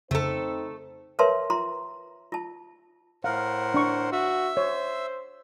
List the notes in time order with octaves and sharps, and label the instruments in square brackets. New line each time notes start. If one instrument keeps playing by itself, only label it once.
[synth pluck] F2 C#3 [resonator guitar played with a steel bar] A3 A4 [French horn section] C4 D#4 C5
[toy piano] A#4 B4 C#5 E5 A5 C6
F4 A#5 C6
F4 A5
[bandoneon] A2 A#4 F#5 [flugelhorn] C5 [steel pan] F5
[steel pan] D4 C#6
[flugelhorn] F#4 [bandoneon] E5 E6
[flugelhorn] C5 [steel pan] C#5